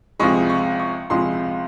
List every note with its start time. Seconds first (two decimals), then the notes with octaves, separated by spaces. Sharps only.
0.20 C#2 C3 F3 G#3 C#6
0.50 C#6
0.79 C#6
1.10 C#2 C3 F3 G#3 C6